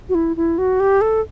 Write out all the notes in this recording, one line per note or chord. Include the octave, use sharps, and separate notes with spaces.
F#4
E4
E4
F#4
G4
A4